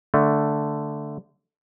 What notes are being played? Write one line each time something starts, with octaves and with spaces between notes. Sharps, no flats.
D3 A3